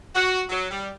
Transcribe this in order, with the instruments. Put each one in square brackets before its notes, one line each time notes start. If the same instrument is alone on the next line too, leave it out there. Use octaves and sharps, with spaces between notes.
[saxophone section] F#4
F#3
G3